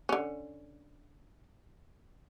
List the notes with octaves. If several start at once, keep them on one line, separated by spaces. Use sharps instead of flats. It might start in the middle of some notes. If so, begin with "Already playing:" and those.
D3 C#4